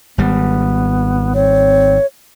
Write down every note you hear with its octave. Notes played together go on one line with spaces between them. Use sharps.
G#1 G3 B3
C4 C#5